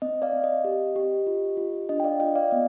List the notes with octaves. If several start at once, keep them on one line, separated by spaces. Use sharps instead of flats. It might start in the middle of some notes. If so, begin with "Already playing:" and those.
C4 D#5
D5 F5
C4
D#5
G4
G4
F4
F4
D4 D#5
G5
D5 F5
F4 D#5 G5
D5 F5
B3 D#5